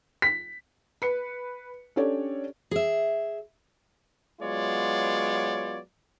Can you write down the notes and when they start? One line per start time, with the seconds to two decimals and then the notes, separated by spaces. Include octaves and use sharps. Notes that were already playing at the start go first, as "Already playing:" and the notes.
0.22 B6
1.02 B4 C#7
1.96 C#4 D4 G4 A4 C#5 D5
2.71 G#4 E5
4.41 F#3 G#3 B3 F4 C#5 D5